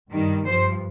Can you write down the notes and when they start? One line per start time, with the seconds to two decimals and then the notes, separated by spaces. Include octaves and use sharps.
0.12 G2 D#3 G3
0.46 G2 F3 C5